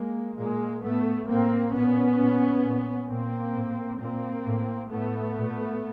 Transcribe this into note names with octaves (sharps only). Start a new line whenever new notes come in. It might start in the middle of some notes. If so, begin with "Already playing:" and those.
Already playing: G#3 A#3
A#2 G#3 A#3
A2 A3 B3
A2 A#3 C4
A#2 B3 C#4
A#2
A#2
A#2 A#3 C4
A2
A#2 A#3 C4
A2
A2 A3 B3
A#2